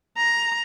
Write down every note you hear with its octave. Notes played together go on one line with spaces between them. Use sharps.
A#5